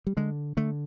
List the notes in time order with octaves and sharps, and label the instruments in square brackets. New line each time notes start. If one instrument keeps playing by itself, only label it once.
[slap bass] G3
D3 G#3
D3 A3